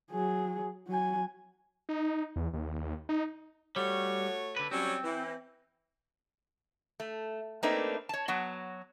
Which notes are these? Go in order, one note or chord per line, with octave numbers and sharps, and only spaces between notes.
F#3 G#4
F#3 G#5
D#4
E2
D#2
D#4
G3 A3 F#4 C#5
D3 B4
F#3 G3 C4 C#4
E3
A3
A3 A#3 C4 D4 D#4 B4
C#5 A5
F#3 B3 F#4